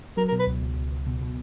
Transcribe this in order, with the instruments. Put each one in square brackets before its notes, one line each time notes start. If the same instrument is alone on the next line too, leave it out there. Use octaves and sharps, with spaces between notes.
[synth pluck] F#3 [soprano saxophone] A#4
[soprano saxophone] A#4
[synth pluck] B2
[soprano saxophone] B4
[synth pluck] C#2
C#2
C#2
C#2
B2
B2